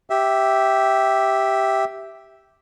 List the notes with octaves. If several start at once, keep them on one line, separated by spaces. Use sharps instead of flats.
G4 E5